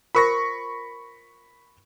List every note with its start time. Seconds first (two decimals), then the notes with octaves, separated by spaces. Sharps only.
0.15 F4 A#4 C5 B5 C#6 A#6